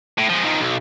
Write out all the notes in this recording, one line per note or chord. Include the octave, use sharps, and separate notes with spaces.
A2
F3 G#3
D#3 F3
B1